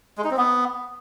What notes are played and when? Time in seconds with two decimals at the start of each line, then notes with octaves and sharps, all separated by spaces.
0.18 G#3
0.24 D#4
0.31 C4
0.37 B3